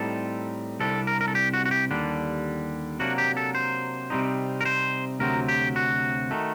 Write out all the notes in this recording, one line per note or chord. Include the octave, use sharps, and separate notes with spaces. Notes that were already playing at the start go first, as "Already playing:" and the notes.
Already playing: A2 G3 C4 D#4 A4
C2 C3 G3 D4 A4
A#4
A#4
A4
G4
F#4
F#4
G4
D#2 D3 G3 D4
C3 F#3 A#3 D4 F#4
G4
A4
C5
C3 G3 C4 D#4
A#4
C5
D2 C3 F#3 C4 A#4
G4
F#4
D#3 A3